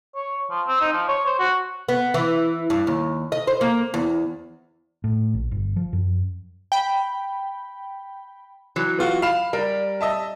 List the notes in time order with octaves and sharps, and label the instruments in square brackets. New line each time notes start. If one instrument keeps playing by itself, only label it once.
[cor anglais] C#5
F3
C4
D#4
F3
C#5
C5
F#4
[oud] B3
E3
G2
D#2
D#5
C5
A#3
E2
[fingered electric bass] A2
A#1
G1
F3
F#2
[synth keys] G5 B5
[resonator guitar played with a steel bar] E3 F#3
[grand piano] B3 F4 F#4
F5 B5 E7
[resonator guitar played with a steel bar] G3 [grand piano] A#4
[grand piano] D#5 E5 A5